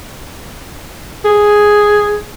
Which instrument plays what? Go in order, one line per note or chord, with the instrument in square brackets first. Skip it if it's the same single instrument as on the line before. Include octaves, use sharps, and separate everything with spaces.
[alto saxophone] G#4